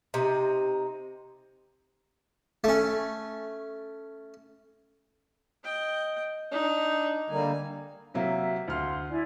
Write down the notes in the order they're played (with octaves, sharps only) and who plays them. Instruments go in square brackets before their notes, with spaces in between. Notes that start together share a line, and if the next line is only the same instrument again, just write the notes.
[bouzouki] C3 D#4
[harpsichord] A3 C#4
[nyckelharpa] D#5 G5
[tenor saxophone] D4 [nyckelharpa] D#4
[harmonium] D3 G3 A#3 [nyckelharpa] G#5
[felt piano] C3 F#3 A#3 [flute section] E5
[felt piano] D2 F6 [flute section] F5 C6
[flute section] E4 D5 G#5